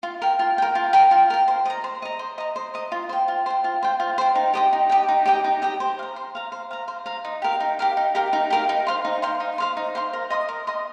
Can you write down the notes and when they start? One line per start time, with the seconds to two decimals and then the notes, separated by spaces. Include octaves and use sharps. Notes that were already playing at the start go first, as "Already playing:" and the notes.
0.03 F4
0.22 A#4 G5
0.39 F4
0.58 A#4 G5
0.75 F4
0.93 A#4 G5
1.11 F4
1.30 A#4 G5
1.48 C5
1.65 D#5 A#5
1.84 C5
2.02 D#5 A#5
2.19 C5
2.38 D#5 A#5
2.56 C5
2.74 D#5 A#5
2.92 F4
3.09 C5 G5
3.28 F4
3.46 C5 G5
3.64 F4
3.83 C5 G5
4.00 F4
4.18 C5 G5
4.35 D#4
4.53 G4 D#5 G5
4.73 D#4
4.89 G4 D#5 G5
5.08 D#4
5.26 G4 D#5 G5
5.44 D#4
5.62 G4 D#5 G5
5.80 C5
5.99 F5
6.02 A#5
6.16 C5
6.35 F5 A#5
6.52 C5
6.71 F5 A#5
6.88 C5
7.06 F5 A#5
7.25 D#4
7.42 G4 A#4 F5
7.60 D#4
7.79 G4 A#4 F5
7.97 D#4
8.15 G4 A#4 F5
8.33 D#4
8.50 G4 A#4 F5
8.69 D#4
8.87 C5 F5 C6
9.05 D#4
9.22 C5 F5 C6
9.40 D#4
9.58 C5 F5 C6
9.77 D#4
9.95 C5 F5 C6
10.13 A#4
10.30 D#5 C6 D#6
10.49 A#4
10.67 D#5 C6 D#6